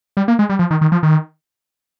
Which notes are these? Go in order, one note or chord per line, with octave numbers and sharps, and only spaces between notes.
G3
A#3
G#3
G3
F3
D#3
D#3
F3
D#3